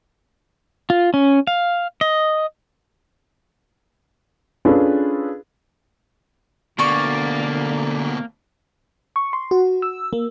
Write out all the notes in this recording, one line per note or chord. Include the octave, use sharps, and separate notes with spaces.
F4
C#4
F5
D#5
C#4 D4 F4 G#4 A4 B4
D2 B2 D3 A#3 D5 C#6
C#6
C6
F#4
E6
A#3